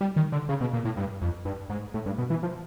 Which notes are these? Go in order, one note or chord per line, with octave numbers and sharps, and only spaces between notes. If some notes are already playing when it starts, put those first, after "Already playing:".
G3
D#3
D3
C#3
B2
A#2
A2
G2
F2
G2
G#2
A2
G2
B2
E3
F3